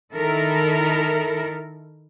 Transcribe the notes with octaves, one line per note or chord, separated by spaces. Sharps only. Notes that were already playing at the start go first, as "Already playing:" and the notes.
D#3 E4 A4 A#4